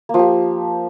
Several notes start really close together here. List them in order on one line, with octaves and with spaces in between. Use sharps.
A#3 F3 G4